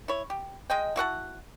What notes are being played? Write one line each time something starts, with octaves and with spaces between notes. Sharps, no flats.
E4 C#5
G4
G#3 D#5 G5
E4 F#4 F#5 A5